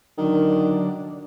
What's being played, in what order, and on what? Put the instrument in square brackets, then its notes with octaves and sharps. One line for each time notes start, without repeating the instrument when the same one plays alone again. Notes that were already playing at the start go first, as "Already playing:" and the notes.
[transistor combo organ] D3 F#3 D4 [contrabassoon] D#3